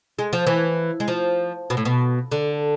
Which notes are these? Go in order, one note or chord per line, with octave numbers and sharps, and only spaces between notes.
G#3
F3
E3
G#3
F3
B2
A2
B2
D3